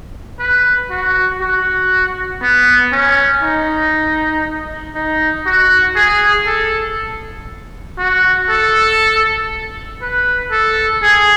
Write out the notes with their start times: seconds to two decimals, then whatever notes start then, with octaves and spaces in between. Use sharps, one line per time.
0.40 B4
0.91 F#4
1.41 F#4
2.42 B3
2.92 C#4
3.43 D#4
4.95 D#4
5.47 F#4
5.96 G#4
6.47 A4
7.99 F#4
8.50 A4
10.02 B4
10.52 A4
11.03 G#4